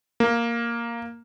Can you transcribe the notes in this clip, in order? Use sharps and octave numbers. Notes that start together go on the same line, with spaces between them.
A#3